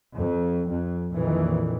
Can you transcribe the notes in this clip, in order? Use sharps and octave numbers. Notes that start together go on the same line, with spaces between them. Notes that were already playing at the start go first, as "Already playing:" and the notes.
F2
F2
A#1 F2 A#2 D#3 E3